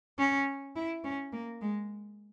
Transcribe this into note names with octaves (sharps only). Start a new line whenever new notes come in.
C#4
E4
C#4
A#3
G#3